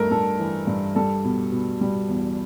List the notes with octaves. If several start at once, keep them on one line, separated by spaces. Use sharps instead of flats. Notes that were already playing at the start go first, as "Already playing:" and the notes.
Already playing: G2 A3 A#4
G2 A4
E3
G2
G3 A4
B2
B2
G3
E2